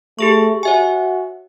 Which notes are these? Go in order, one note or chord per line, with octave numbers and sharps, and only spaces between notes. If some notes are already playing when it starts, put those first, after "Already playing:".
A3 G4 G#4 C#6
F#4 C#5 E5 G#5